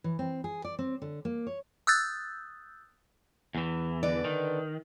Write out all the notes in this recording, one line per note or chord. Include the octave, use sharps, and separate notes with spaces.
E3
C4
G#4
D5
C4
D3
A#3
C#5
D#6 E6 F#6 G6 A6
E2 E3
D3 B4 D5
D#3